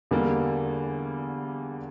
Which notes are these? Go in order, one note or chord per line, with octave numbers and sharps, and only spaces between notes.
E2 D3 G3 A#3